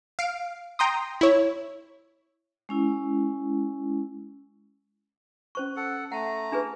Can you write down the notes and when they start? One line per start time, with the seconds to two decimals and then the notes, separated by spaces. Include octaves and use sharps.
0.19 F5 D7
0.79 G5 A#5 C6 D#6
1.21 E4 C#5
2.69 G#3 C#4 E4
5.55 C#4 C5 C#6
5.76 A4 F#5
6.12 A3 F#5 A5 A#5
6.52 D4 G#4 B4